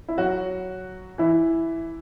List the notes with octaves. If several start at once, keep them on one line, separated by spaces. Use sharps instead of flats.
E4
F#3 F#4
E3 E4